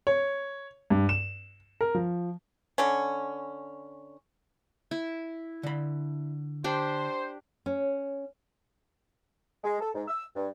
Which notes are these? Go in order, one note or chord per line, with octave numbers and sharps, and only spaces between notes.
C#5
G2
E7
A#4
F3
D3 C#4
E4
D3 B5
D4 G4 C5
C#4
G#3
A4
G#2
E6
G2